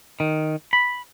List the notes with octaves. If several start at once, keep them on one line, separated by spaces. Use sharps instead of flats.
D#3
B5